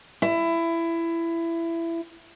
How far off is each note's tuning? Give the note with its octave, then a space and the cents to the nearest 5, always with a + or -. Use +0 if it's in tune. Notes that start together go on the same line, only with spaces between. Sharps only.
E4 +20